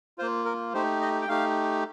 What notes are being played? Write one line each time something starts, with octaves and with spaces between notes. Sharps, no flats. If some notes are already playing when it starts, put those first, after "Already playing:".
A#3 F4 C5
A#4
A3 D#4 G4 C5
D#5
G5
A3 D#4 G4 F5